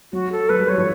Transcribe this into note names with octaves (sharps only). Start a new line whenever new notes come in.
F#3 F#4
A4
F#3 B4
G3
F#3 C#5
F3